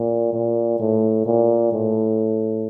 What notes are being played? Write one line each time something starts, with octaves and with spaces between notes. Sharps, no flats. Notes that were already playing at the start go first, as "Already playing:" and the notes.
Already playing: A#2
A#2
A2
A#2
A2